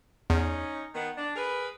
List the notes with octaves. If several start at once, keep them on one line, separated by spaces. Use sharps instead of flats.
E2 C#4 D#4
D#3 B3
D4
G#4 A#4 B4